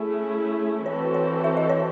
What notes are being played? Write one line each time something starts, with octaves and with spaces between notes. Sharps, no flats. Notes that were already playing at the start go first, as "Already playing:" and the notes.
Already playing: A3 C#4 E4 G#4
E3 C4 F#4 A4 C5 C#5
C#5
E5
D#5
C#5